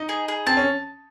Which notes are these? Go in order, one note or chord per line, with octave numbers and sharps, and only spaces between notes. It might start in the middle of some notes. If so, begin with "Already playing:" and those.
Already playing: D#4 D#5
G#4
G#4
C4 A5
C#4